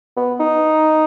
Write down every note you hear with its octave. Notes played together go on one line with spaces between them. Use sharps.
B3
D#4